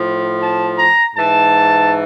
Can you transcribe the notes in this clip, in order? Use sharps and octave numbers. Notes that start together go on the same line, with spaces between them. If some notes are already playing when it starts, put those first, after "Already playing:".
Already playing: A2 F3
A5
A#5
G#2 E3 A5